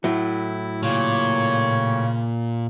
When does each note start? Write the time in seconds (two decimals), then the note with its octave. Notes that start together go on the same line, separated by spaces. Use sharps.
0.04 A2 F#3 E4
0.83 A#2 C#3 C#5